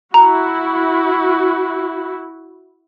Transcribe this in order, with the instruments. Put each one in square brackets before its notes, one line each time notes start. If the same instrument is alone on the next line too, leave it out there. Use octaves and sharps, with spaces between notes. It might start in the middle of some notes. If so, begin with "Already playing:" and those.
[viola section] E4 F#4 [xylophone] A#5